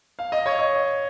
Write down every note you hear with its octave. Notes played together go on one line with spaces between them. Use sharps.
F5
D#5
C#5
D#5